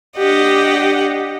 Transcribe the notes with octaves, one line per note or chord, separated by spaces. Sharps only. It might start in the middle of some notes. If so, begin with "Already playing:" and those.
D4 G4 D#5 F#5